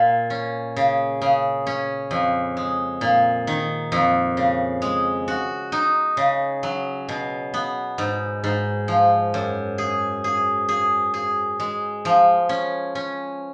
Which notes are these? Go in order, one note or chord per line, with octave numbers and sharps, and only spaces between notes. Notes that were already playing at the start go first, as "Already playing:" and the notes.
Already playing: A#2
C#4
C#3
C#3
C#4
F2
G#3
A#2
D#3
F2
C#3
G#3
F#4
D#4
C#3
F#3
B2
B3
G#2
G#2
F3
F#2
G#4
G#4
G#4
G#4
G#3
F3
C#4
C#4